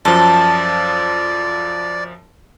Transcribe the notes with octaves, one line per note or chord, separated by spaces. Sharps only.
F#2 F3 A4 D5